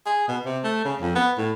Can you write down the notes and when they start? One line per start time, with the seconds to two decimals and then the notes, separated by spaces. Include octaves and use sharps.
0.06 G#4
0.28 B2
0.45 C3
0.64 A3
0.85 C#3
1.01 F2
1.15 B3
1.38 A2